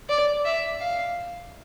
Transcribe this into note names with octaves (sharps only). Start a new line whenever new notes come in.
D5
E5
F5